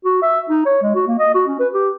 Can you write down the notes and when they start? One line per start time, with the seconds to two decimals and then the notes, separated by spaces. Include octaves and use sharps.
0.05 F#4
0.22 E5
0.50 D#4
0.66 C#5
0.83 G#3
0.95 F#4
1.07 A#3
1.19 D#5
1.35 F#4
1.48 C#4
1.59 B4
1.73 G4